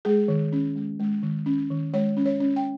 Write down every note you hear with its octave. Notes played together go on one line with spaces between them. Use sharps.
G#3 G#4
D#3
C#4
G#3
G#3
D#3
C#4
D#3
G#3 C#5
C#4
C#5
C#4
G5